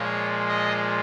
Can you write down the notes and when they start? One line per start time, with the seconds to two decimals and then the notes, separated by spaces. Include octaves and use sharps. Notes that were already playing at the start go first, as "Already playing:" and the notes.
Already playing: A#2 F3 G#3 C#5
0.48 D#5